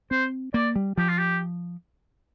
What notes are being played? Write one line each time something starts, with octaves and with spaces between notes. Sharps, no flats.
C4 C5
A#3 D5
G3
F3 G4
F4
G4